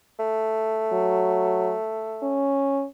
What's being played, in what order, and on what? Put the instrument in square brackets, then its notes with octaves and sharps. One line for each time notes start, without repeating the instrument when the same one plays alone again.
[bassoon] A3
[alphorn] F#3
C#4